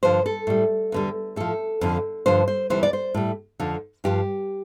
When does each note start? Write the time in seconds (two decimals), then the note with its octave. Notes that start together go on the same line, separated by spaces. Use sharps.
0.03 G2 D3 F3 C5
0.26 A4
0.47 A2 G3
0.92 E2 D3 G3
1.36 A2 F3 A4
1.81 F2 D3 F3
2.26 G2 D3 F3 C5
2.48 C5
2.70 D2 C3 E3 G3 C5
2.83 D5
2.93 C5
3.14 A2 G3
3.60 F2 D3 F3
4.04 G2 F3 G4